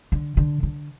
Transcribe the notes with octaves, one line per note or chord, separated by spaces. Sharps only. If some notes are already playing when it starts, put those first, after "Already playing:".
D3
D3
D3